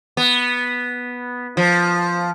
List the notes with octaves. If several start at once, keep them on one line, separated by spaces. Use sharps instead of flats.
B3
F3